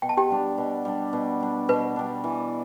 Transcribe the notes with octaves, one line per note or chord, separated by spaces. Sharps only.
B2 G5
A5
G4 G5
G3 D4
B2
G3 D4
B2
G3 D4
B2 B4
G3 D4
E3